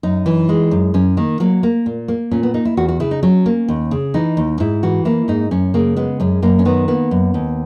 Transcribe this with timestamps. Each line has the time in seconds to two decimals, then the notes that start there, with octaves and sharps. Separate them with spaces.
0.03 F#2 D#4
0.26 E3
0.49 G#3
0.71 F#2
0.94 F#2 C#4
1.17 D#3 A#3
1.40 F#3 A#3
1.63 A#3
1.86 A#2
2.08 A#3
2.31 A#2 C#4
2.43 B3
2.54 A#3 D#4
2.65 E4
2.77 E2 F#4
2.88 F#4
3.00 C#3 E4
3.11 D#4
3.23 F#3 C#4
3.46 A#3
3.68 D#2
3.91 C#3
4.14 E3 D#4
4.37 D#2
4.60 G#2 E4
4.83 E3 F#4
5.05 A#3 E4
5.28 G#2 D#4
5.51 F#2 C#4
5.74 C#3 A#3
5.97 G#3 B3
6.20 F#2 C#4
6.42 F#2 A#3
6.59 C#4
6.65 D#3 B3
6.88 A#3 B3
7.11 F#2
7.34 D#2